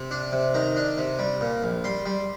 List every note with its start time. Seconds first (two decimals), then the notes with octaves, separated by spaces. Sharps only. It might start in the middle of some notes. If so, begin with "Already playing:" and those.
Already playing: C3
0.11 D4
0.32 C3
0.54 D#3 A#5
0.76 D4
0.98 C3
1.19 G3
1.41 A#2
1.63 A#1
1.84 G3 C6
2.06 G3